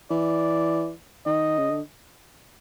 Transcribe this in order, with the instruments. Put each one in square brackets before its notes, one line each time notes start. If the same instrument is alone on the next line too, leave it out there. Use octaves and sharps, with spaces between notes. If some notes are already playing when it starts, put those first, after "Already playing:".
[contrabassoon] E3 [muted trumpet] D5
[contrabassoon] D#3 [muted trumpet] D#5
[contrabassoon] C#3
D3